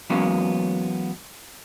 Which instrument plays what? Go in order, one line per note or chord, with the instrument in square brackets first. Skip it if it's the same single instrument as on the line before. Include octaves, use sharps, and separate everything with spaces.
[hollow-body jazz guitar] E3 F#3 G#3 A#3 B3 C#4